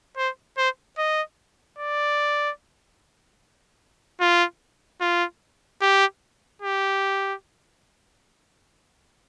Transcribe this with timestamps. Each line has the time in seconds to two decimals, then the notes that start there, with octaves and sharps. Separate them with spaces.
0.17 C5
0.57 C5
0.98 D#5
1.79 D5
4.20 F4
5.01 F4
5.81 G4
6.62 G4